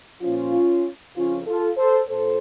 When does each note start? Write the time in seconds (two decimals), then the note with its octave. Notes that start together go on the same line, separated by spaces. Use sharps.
0.21 A#2 F3 C#4 F4
1.16 F2 C#3 F3 C#4 F4
1.46 F4 A4
1.77 A4 C5
2.09 A#2 A4 C5